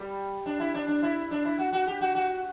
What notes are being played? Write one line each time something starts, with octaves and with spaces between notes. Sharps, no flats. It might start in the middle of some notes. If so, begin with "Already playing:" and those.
Already playing: G3
D4
E4
D4
D4
E4
D4
E4
F#4
F#4
G4
F#4
F#4